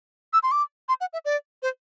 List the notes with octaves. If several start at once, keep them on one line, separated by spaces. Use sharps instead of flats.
E6
C6
D6
C6
F#5
E5
D5
C5